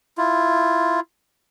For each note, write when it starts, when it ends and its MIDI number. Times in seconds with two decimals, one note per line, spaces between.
0.18 1.00 64
0.18 1.00 65